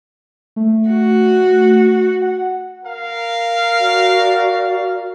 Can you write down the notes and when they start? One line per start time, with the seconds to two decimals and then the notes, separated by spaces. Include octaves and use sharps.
0.56 A3
0.88 F#4
2.22 F#5
2.86 A#4 F5
3.79 F#4 D5